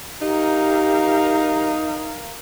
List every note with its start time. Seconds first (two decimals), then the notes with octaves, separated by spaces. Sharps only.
0.22 D#4 G4 A#4 F5